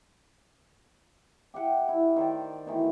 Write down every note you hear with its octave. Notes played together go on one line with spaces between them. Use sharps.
G4 E5 F#5 G5
E4
D#3 C5 D5
B2 D#3 E3 A3